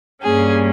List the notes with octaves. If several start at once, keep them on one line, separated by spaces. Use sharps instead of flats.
G2 G3 A#3 C#4 G#4